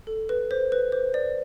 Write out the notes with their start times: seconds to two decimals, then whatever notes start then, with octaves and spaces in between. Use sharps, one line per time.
0.07 A4
0.29 B4
0.51 C5
0.72 B4
0.92 C5
1.14 D5